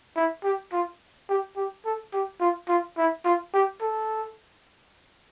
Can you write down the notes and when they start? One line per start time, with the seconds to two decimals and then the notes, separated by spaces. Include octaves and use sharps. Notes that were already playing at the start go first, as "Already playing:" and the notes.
0.16 E4
0.44 G4
0.73 F4
1.29 G4
1.56 G4
1.85 A4
2.13 G4
2.40 F4
2.68 F4
2.98 E4
3.25 F4
3.54 G4
3.81 A4